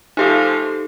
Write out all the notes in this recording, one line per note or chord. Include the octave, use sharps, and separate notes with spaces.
F3 A3 D#4 G4 A4 F5